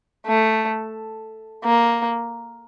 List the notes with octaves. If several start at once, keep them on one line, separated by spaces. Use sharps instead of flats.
A3
A#3